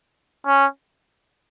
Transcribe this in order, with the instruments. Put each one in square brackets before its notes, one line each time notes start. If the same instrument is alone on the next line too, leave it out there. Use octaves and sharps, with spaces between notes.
[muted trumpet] C#4